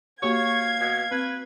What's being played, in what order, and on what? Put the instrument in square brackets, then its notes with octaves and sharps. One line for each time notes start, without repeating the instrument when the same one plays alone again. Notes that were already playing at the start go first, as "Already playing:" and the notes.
[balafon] A#3 F#4 G4 [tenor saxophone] C#5 [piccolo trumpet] F5 [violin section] G#6
[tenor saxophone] B2
[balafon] C4 [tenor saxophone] B4